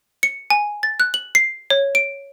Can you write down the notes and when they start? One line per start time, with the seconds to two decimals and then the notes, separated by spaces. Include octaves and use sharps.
0.23 C#7
0.50 G#5
0.83 A6
1.00 F#6
1.14 F#7
1.35 C7
1.70 C#5
1.95 D7